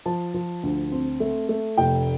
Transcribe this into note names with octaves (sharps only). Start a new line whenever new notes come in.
F3 A5
F3
D2
C4
A3
A3
F1 G5